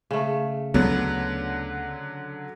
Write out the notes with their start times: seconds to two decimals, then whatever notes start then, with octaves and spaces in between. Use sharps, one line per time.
0.11 C#3 A3
0.74 D2 D3 F#3 B3